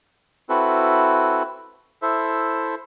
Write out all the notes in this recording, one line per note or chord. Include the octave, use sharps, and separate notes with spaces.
C4 E4 F#4 A4 B4
E4 A4 C5 E5